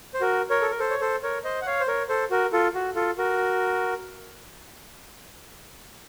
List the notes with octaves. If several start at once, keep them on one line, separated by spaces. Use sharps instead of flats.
C5
F#4 A#4
A#4 C#5
A4
A#4
A4 C5
C#5
A4 C5
A#4 C#5
C5 D#5
F#5
C#5 F5
C5
A#4 C#5
A4 C5
F#4 A#4
F4 A4
F#4
F4 A4
F#4 A#4